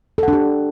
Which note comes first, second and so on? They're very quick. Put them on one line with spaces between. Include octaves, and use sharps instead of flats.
A4 F#5 D4 G4